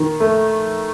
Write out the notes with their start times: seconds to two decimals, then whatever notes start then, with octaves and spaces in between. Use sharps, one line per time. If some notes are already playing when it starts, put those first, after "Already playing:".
Already playing: D#3
0.20 A3